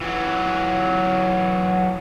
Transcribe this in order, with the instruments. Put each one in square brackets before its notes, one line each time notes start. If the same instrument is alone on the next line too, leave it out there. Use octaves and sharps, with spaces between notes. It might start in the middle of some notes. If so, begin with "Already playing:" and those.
[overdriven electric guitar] E3 F#3